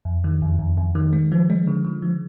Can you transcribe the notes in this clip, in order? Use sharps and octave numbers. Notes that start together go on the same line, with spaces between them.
F2
D#3
F2
F2
F2
D#3
G#3
F3
G#3
D3
D3
F3